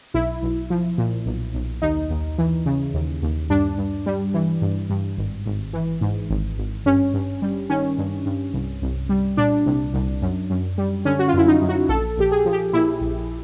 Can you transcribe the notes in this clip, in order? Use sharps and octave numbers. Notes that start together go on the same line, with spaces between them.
B1 E4
B1
F3
A#2
B1
B1
D#2 D#4
D#2
E3
C#3
D#2
D#2
G2 D4
G2
G3
E3
G2
G2
G#1
G#1
E3
G#2
G#1
G#1
G2 C#4
G2
G3
D#3 C#4
G2
G2
C2
C2
G3
A#2 D4
C2
C2
F#2
F#2
G3
D3 C#4
F#4
F4
F#2 E4
D#4
F#2
F#4
A#1 A4
A#1 G4
G#4
F3
G4
A#2 E4
A#1